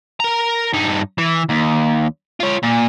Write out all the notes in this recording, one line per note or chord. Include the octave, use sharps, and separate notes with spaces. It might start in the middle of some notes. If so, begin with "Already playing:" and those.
A#4 A#5
G2 D#4
E3
D#2
F4 C#5
A#2